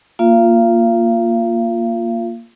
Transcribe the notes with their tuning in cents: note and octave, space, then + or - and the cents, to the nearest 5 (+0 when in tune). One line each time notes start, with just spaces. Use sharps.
A#3 +0 F4 +0 F5 -40